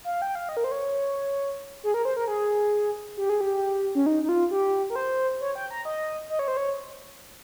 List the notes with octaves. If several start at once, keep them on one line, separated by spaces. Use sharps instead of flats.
F5
G5
F5
D#5
A#4
C5
C#5
G#4
A#4
C5
A#4
G#4
G4
G#4
G4
C#4
D#4
D#4
F4
G4
A#4
C5
C#5
G5
A#5
D#5
D#5
C#5
C5
C#5